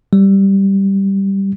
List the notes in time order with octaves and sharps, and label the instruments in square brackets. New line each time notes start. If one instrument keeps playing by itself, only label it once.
[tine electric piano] G3